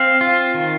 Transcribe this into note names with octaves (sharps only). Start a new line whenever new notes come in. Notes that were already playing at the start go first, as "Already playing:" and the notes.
Already playing: C4 F5
F4
D#3